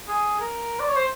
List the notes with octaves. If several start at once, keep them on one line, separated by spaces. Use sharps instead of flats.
G#4
A#4
D5
C#5
C5